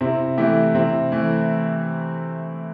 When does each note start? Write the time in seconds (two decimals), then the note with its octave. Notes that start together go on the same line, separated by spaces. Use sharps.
0.01 C3 C4 E4
0.37 E3 A3 E4 G4
0.74 C3 C4 E4
1.12 E3 A3